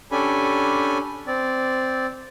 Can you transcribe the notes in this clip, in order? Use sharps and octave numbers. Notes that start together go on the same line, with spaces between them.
C#4 D4 G4 A4 G#5 B5
C4 D5